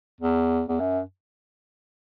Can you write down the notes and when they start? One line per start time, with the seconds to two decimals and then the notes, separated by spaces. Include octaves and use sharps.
0.21 E2
0.68 E2
0.80 F#2